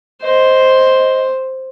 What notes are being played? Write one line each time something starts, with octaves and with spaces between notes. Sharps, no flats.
C5 D#5